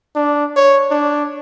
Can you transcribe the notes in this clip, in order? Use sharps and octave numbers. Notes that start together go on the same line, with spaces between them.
D4
C#5
D4